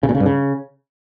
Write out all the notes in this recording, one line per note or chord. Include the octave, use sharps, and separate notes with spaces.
C#3
A#2
C#3
G2
C#3